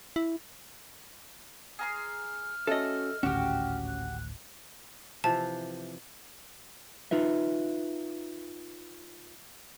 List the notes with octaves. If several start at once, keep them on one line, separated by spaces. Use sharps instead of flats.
E4
G#4 A#5 C6 F6
A3 C#4 F#4 A4 D#5
G#1 D2 A2 C#4 F#4 G4
F#6
C3 E3 F3 A5
D#4 F4 B4 E5